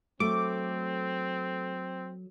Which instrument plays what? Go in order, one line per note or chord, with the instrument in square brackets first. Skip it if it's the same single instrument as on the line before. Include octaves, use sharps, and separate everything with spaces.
[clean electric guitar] F#3 [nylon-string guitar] A3 [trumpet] C4 [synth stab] D6